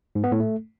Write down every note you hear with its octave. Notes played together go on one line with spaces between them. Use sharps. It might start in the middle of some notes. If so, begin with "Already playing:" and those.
G#2
B3
A2
A3